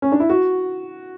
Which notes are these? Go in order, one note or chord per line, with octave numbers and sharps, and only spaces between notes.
C#4
D4
E4
F#4